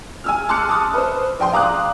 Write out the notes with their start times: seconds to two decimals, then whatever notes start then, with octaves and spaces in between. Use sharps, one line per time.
0.24 G#5 E6 F6
0.49 A5 C6 D6 F6 F#6 C#7
0.69 A5 D6 D#6
0.94 B4 C5
1.40 A#1 G5 C6
1.53 F5 A#5 D6 D#6 F#6